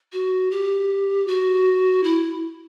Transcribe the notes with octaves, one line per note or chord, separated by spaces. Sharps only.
F#4
G4
F#4
E4